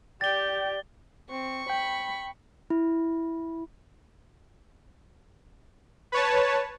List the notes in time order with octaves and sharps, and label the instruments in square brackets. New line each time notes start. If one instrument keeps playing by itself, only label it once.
[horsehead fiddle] G4 G5 [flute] D5 [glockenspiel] A6 G7
[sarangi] C4 [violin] C#6
[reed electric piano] G5 [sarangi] B5
[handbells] E4
[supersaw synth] B4 C#5 A5